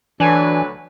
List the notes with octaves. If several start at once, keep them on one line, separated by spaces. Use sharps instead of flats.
D2 E3 F#3 D4 B4 G#5